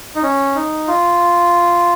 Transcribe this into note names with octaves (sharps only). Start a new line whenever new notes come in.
D#4
C#4
D#4
F4